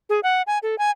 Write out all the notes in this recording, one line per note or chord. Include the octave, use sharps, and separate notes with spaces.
G#4
F#5
G#5
A4
G#5